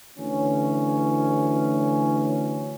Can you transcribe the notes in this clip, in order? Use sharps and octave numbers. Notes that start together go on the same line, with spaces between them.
D2 E3 C#4